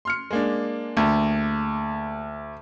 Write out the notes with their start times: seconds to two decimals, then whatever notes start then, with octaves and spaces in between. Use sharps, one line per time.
0.05 C6 F6 C#7
0.30 G#3 A#3 D4
0.97 D2